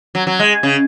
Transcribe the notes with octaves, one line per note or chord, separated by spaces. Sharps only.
F#3
F#3
G#3
C#3